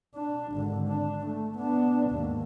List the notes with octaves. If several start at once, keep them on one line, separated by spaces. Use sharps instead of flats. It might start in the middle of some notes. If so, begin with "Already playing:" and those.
D4
G#1 D3
D4
A3
B3 D4
D#2 G#2